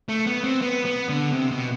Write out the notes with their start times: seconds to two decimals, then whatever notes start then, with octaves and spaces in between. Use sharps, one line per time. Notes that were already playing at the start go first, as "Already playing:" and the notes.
0.09 A3
0.27 B3
0.44 C4
0.62 B3
0.85 B3
1.09 D3
1.33 C3
1.51 B2